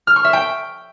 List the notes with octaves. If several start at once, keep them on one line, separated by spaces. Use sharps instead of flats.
F6
C#6
E5
G5